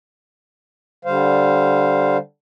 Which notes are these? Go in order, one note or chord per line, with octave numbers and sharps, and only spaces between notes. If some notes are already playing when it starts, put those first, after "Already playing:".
D3 G3 C5 F5